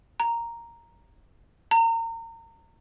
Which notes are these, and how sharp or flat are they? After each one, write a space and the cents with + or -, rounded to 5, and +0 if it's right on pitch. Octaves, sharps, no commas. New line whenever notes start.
A#5 -5
A#5 -30